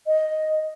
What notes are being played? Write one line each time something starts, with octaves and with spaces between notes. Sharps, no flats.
D#5